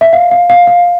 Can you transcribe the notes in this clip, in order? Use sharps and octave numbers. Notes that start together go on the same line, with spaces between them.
E5
F5
F5
F5
F5